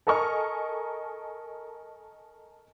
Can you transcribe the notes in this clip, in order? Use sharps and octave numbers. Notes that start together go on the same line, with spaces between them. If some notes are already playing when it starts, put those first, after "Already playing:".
A4 A#4 D#5 G#5 C#6 F6